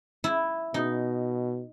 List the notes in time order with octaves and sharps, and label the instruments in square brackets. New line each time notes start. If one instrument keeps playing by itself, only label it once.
[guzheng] E4
[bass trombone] B2 [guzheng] D#4